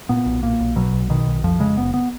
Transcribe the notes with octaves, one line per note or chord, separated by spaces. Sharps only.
A#2 B3
B1
A#2 A#3
B1
B2 F#3
B1
B2 D#3
B1
F2 F3
C#3 G#3
F#1 B3
B3